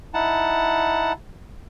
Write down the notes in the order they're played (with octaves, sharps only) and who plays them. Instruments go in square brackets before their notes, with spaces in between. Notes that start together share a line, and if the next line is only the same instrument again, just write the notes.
[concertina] D#4 E4 F#5 A5